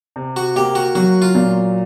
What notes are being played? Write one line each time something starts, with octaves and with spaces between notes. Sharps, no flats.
C3
F#4
A#3 G4
F#4
F#3 F#4
F4
A#2